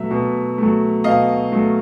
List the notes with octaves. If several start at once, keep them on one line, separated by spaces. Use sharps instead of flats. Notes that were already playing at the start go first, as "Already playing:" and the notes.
Already playing: B2 F#3 A3 E5
B2
F#3 A3
B2 D#5 F5
F#3 A3